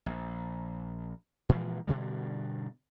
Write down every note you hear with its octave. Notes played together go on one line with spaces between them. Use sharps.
A#1
A#2 E3 F3 G#3
G2 B2 D3 G3